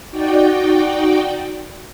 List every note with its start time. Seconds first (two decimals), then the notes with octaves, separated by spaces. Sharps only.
0.11 D#4 F#4 D5 G5